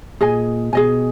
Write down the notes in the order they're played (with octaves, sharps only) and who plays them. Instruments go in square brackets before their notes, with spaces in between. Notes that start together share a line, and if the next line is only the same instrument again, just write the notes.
[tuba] A#2 [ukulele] G#4 D#5 G#5
[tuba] B2 [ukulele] G#4 D#5 G#5